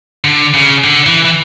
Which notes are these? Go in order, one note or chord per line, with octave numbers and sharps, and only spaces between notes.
D3
C#3
D3
E3
E3